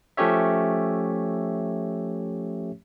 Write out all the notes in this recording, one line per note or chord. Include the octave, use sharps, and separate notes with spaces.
F3 A3 C#4 G4 C#5 E5